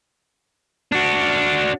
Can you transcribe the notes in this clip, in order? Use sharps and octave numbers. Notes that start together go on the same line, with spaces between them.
D4 F#4